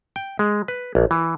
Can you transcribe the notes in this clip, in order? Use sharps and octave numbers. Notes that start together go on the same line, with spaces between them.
G5
G#3
B4
A#1
E3